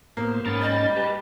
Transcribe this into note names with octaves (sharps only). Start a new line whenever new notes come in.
A2 A#3 B3 C5
G#2 B3 C#4 A#4 A6
G3 D#5
G4 B4 A5